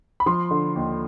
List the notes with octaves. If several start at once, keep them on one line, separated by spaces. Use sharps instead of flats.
B5
F3 C6
D3
D#2